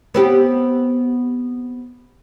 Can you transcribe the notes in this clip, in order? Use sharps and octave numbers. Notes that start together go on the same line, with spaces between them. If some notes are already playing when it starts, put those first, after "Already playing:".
B3 C4 G4